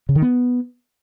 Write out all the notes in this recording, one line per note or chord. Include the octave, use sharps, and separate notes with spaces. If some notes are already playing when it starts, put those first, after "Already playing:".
C#3
D#3
B3